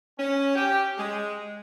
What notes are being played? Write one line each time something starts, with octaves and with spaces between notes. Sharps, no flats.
C#4
G4
G#3